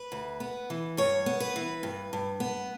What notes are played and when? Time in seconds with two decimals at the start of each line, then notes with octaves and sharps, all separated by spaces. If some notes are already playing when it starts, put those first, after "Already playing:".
Already playing: B4
0.12 D2
0.40 B3
0.70 E3
0.97 G2 C#5
1.26 B3
1.40 B4
1.56 E3
1.83 G2
2.13 G2
2.40 B3